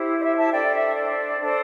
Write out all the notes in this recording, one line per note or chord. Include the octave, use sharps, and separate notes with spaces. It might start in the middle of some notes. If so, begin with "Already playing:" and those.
Already playing: E4 G4 C5
D5
E5
E5 A5
D4 A4 C5 D5 G5
E5
D5
D4 A4 C5